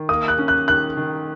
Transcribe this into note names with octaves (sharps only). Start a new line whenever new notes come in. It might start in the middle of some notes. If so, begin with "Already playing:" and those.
Already playing: D#3
A#3 D#6
F#6
C#4
F#6
D#3 F#6
D#3